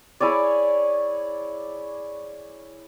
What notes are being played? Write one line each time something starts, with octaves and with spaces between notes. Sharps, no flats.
E4 G#4 C#5 D5